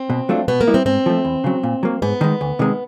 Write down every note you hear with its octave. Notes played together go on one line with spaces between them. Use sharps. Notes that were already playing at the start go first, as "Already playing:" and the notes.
Already playing: C4
B2
F#3 A3 D4 F4
B2 B3
A#3
G3 B3 E4
C4
G#2 C4
F3 A3
E2
C#3 F#3
A#2
F#3 A#3
G#2 B3
D#3 G#3
D2
C3 D#3 G#3